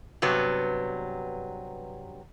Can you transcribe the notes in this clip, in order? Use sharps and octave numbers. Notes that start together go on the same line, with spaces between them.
G2 C3 F#3 B3